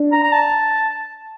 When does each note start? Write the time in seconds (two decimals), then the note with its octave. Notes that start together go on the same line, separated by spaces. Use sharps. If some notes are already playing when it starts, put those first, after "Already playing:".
Already playing: D4
0.13 A#5
0.23 A#5
0.32 A5